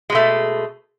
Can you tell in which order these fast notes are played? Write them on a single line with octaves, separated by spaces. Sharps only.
G#3 B2 A3